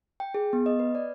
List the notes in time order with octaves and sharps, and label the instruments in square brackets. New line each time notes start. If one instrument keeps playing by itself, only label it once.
[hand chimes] G5
G#4
B3
D#5
B4
D5